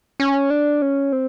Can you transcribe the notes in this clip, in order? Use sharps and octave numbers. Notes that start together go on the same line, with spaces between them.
C#4
D4
C#4
C4